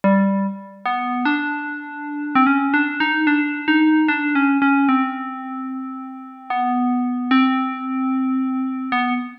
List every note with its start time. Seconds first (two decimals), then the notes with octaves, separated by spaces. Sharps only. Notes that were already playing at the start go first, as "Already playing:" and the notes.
0.04 G3
0.86 B3
1.25 D4
2.35 C4
2.47 C#4
2.74 D4
3.00 D#4
3.27 D4
3.68 D#4
4.08 D4
4.35 C#4
4.62 C#4
4.89 C4
6.50 B3
7.31 C4
8.92 B3